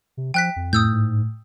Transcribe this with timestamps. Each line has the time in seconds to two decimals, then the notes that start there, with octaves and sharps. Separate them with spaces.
0.17 C3
0.34 F3 G5 F#6 B6
0.56 F2
0.73 A2 D#6 E6 G6
0.92 G#2